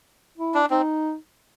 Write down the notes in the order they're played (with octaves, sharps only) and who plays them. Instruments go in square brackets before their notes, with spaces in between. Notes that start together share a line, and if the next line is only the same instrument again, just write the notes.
[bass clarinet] E4
[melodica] D4
[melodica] C4 [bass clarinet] D#4